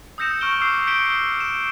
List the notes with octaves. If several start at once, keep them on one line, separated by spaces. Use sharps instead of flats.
D#6 E6 G6 A#6 C#7 E7
C#6 F6 D7 E7 G7
D6 E6 G6 C7
G6 B6 C#7 D7 E7 G7
G7
E7